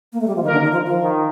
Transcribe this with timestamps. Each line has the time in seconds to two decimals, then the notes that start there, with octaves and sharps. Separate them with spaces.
0.13 A#3
0.21 A3
0.27 G3
0.35 F3
0.42 D#3 A#3 D#4 A#4
0.52 D3
0.63 D#3
0.72 F3
0.86 F3
1.01 D#3